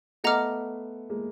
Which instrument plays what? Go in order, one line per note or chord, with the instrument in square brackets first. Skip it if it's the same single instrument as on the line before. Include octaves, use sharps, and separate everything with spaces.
[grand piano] A3 B3 [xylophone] D#5 F#5 A#5 D6 F6
[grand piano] G#3 A#3